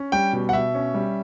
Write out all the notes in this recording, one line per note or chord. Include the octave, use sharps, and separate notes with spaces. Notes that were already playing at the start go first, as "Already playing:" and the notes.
Already playing: C#4
G3 G5
B2
F#5
B2 E5
C#4
G3